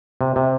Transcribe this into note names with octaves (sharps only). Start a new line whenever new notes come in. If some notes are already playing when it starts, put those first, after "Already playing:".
C3
C3